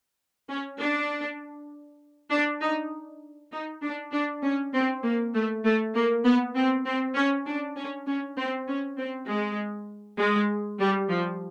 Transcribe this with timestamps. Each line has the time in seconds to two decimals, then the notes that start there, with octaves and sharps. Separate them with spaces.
0.49 C#4
0.79 D4
2.31 D4
2.61 D#4
3.52 D#4
3.83 D4
4.13 D4
4.43 C#4
4.74 C4
5.03 A#3
5.34 A3
5.64 A3
5.95 A#3
6.24 B3
6.56 C4
6.86 C4
7.15 C#4
7.46 D4
7.77 C#4
8.07 C#4
8.37 C4
8.68 C#4
8.98 C4
9.28 G#3
10.19 G#3
10.79 G3
11.10 F3